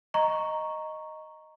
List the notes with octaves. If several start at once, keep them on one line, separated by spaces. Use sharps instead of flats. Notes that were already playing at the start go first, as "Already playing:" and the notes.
D#5 A#5 C#6